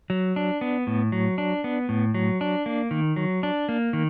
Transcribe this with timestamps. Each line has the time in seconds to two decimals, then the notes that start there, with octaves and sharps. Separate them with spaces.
0.10 F#3
0.36 D4
0.61 B3
0.87 A2
1.12 F#3
1.38 D4
1.64 B3
1.89 A2
2.14 F#3
2.41 D4
2.66 A#3
2.91 D#3
3.16 F#3
3.43 D4
3.69 A#3
3.93 D#3